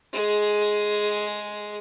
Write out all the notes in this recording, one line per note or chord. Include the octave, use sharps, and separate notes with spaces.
G#3 G#4